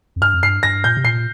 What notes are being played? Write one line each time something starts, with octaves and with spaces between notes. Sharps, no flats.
F2
G2 F6
F2
G2 C7
G2 A#6
A#2 G6
C3
A#2 C7